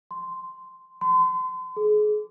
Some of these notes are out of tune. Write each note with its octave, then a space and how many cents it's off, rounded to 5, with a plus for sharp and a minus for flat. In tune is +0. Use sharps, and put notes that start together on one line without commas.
C6 -10
C6 -35
G#4 +30